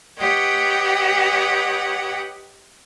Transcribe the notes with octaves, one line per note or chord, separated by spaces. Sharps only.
G4 B4 C#5 D#5 F#5 G5